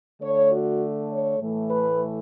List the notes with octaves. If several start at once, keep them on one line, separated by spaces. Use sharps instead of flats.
D3 A3 C#5
F#4
C#5
A2 E3 A3
B4